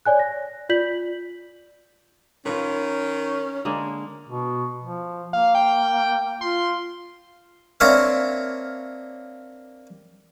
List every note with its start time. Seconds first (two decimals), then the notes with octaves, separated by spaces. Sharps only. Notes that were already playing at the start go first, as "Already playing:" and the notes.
0.05 C#5 D5 G#5 F#6
0.19 A#6
0.69 F4 D5 G6 B6 F#7
2.46 D#3 C#4 F4 B4
3.65 D3 G#3 A#3
4.29 B2
4.83 F3
5.33 A#3 F5
5.55 G5
6.41 F4 C6
7.80 A#3 C4 D4 C#5 E5 F5